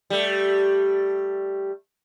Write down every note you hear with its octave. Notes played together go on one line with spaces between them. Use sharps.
G3 A3